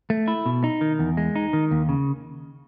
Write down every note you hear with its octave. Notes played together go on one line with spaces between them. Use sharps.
A3
E4
B2
D#4
D#3
E2
G#3
D#4
D#3
D#2
C#3